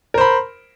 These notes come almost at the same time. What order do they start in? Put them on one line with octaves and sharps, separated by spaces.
A#4 C5 B5